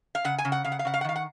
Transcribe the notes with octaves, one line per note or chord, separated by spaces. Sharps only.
F5
C#3 F#5
G#5
C#3
F#5
C#3 F5
F#5
F5
C#3 F#5
F5
F#5
D#3 F5
F#5